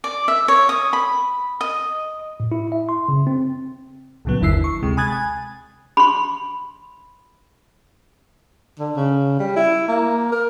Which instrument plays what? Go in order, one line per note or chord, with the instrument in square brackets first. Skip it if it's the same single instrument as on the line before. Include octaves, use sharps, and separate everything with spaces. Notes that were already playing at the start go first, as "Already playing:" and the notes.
[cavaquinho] D5
E5
C#5
D#6
B5
D#5
[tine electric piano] A2
E4
E5
C6
C#3
C4
[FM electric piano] C#2 A#2 C#3 F#3 B3
G1 D#2 D3 E4 E6 C7
C#6
D2 C3 G#3
G#5 B5 D#6 F#6 G#6 A6
G#5
[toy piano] B5 C6
[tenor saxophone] D3
C#3
G3
E4
A#3
A#4